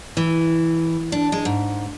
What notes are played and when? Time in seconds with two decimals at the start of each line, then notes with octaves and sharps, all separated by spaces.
0.17 E3
1.12 D4
1.32 G#3
1.45 G#2